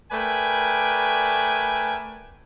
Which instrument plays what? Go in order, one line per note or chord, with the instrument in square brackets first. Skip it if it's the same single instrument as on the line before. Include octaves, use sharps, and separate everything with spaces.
[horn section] A3 A#4 B4 D5 G5 G#5